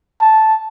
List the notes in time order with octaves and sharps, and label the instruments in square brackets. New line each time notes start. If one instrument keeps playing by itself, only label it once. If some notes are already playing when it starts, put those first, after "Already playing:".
[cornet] A5